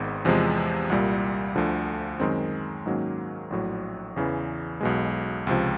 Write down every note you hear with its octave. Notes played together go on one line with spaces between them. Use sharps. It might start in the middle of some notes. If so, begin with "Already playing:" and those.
Already playing: G#1 G#2 D#3 G#3 B3
E2 C3 F3 G#3
C2 A#2 G3
D2 D3 F3
F#2 D#3 G#3 C4
G#2 D#3 F#3 A#3 C#4
A#1 A2 F#3
E2 C#3 E3
B1 B2 G#3
C#2 C3 F3